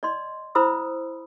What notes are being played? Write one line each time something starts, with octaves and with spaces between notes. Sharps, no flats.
D5 D#5 C6
E4 C5 B5 D#6 E6